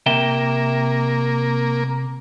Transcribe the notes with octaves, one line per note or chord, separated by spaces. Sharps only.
C3 A#3 E5 G5